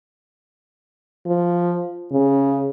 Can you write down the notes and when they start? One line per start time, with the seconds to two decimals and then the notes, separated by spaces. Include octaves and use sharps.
1.26 F3
2.12 C#3